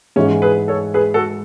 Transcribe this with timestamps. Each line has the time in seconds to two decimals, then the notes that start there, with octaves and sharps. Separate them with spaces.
0.16 G#2 E3 G#3 C#4
0.42 G#4 B4
0.68 A4 C#5
0.94 G#4 B4
1.14 F#4 A4